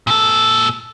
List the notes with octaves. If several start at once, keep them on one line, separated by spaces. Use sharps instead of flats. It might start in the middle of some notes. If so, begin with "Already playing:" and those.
A#2 A4